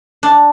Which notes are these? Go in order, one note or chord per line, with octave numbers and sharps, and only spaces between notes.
D4